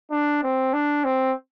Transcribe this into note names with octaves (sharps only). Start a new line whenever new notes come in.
D4
C4
D4
C4